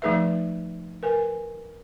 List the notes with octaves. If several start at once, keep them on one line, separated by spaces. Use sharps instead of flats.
F3 A3 D#4 G#4 B4 E5
A#4 B4 G#5